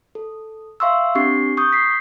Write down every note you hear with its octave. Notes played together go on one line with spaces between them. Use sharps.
A4
E5 F5 C6 C#6 E6
C4 D4 G4 C#6 C7
C#6 D#6 G6
B6 C7